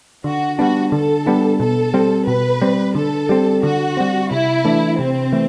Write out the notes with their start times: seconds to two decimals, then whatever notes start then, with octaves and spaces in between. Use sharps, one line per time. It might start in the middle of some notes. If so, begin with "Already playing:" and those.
0.24 D3 F#4
0.58 G3 B3 D4 F#4
0.92 D3 A4
1.26 G3 B3 D4
1.60 B2 A4
1.94 G3 C4
2.27 B2 B4
2.62 G3 C4
2.95 D3 A4
3.29 G3 C4
3.63 D3 F#4
3.97 G3 C4
4.31 C3 E4
4.65 E3 A3 D4
4.99 C3 C4
5.32 E3 A3